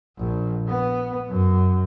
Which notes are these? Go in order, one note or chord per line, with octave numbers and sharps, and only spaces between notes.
A#1
B3
F#2